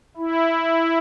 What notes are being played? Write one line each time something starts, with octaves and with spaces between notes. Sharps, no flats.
E4